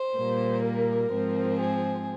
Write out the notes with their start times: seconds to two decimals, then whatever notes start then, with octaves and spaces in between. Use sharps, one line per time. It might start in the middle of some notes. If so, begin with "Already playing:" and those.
Already playing: C5
0.17 A#2 G3 A#3
0.64 A#4
1.11 G#2 F3 C4
1.59 G#4